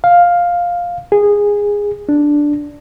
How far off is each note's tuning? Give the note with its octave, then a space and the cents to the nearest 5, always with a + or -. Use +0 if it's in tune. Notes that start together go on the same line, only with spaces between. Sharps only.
F5 +5
G#4 -15
D4 +0